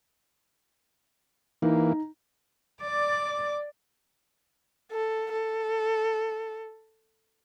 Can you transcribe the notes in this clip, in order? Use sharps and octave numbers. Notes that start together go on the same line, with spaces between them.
E3 A#3 D#4
D5 D6
A4
A4